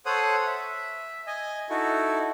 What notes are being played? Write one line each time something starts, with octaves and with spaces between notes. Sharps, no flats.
A4 C5 C#5 F#5 D#6
E5
D#5 G#5
D#4 E4 F#4 A4